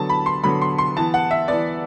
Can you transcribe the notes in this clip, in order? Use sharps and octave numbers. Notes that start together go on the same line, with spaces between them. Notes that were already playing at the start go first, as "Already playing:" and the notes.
Already playing: D3 F#3 B3 A5
B5
C6
D3 F#3 B3 B5
C6
C6
E3 B3 A5
F#5
E5
E3 B3 D5